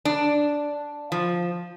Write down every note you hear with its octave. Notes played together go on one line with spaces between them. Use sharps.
D4
F3